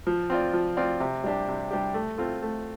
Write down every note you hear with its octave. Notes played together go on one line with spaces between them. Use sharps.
F3
C4 F4 D5
F3
C4 F4 D5
C3
G3 D4 G4
C3
G3 D4 G4
A3
C4 F4 A4
A3